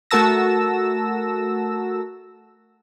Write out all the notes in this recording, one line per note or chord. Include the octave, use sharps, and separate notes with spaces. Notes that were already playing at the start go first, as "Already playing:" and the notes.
A3 F#4 A#4 A5 E6 A#6